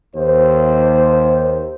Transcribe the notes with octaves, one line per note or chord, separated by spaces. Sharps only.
D#2 C5